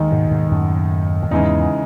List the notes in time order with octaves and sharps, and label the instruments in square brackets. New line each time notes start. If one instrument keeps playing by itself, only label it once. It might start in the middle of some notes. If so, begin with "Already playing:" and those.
Already playing: [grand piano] D#2 D#3 G#3 D#4
[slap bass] G#2 B2
G#2 B2
F#2 A2
A2
[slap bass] E2 G#2 [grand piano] C#3 E3 G#3 D#4